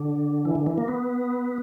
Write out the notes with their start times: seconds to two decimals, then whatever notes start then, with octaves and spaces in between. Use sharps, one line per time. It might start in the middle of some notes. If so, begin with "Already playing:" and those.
Already playing: D3
0.45 E3
0.55 D3
0.66 E3
0.78 A#3
0.88 B3